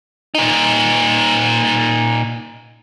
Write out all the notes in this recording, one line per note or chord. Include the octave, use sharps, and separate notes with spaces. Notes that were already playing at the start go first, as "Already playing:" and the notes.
A#2 D#4